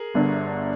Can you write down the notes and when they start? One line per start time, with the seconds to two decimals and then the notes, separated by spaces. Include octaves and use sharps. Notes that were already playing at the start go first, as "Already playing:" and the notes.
Already playing: G#4 A#4
0.14 G1 G2 D3